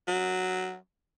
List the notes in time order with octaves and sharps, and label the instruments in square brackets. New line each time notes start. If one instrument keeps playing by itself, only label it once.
[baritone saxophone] F#3